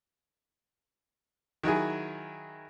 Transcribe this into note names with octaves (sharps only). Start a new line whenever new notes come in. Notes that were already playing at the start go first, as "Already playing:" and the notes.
D#3 F#3 E4 G#4